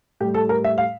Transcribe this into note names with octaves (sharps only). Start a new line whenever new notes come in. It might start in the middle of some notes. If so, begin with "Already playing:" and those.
A2 G3 G4
A4
A#4
E5
F5